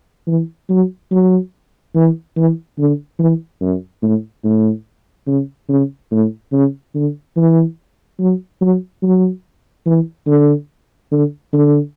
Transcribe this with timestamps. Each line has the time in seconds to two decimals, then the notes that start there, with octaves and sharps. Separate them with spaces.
0.27 E3
0.69 F#3
1.12 F#3
1.95 E3
2.37 E3
2.79 D3
3.19 E3
3.61 F#2
4.03 A2
4.44 A2
5.27 C#3
5.69 C#3
6.11 A2
6.52 C#3
6.95 D3
7.37 E3
8.19 F#3
8.62 F#3
9.03 F#3
9.86 E3
10.27 D3
11.12 D3
11.53 D3